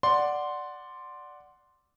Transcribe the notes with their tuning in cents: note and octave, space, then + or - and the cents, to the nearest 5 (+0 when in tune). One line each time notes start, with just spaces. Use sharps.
D5 +0 F#5 +0 C6 +0